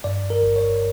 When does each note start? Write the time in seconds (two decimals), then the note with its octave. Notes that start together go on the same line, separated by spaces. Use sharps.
0.04 G2 D5
0.30 A#4
0.43 G1
0.56 C#5